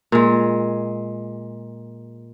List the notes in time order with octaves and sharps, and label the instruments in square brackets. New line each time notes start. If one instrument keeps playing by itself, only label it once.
[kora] A#2 G#3